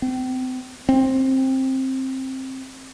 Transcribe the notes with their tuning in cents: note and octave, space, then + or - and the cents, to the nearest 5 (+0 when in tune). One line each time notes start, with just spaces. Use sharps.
C4 -35
C4 +15